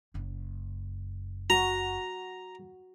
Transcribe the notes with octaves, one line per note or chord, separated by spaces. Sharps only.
F#1 F#2
F#4 A#5